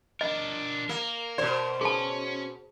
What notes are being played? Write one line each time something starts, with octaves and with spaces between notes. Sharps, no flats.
D4 A#4 D#5
A#3 A#4
B2 C5 D5
C#4 G#4 A5